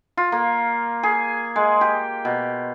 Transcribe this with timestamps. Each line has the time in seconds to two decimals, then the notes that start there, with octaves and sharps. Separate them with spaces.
0.17 F4
0.32 A#3
1.03 G#4
1.56 G#3
1.81 G4
2.25 B2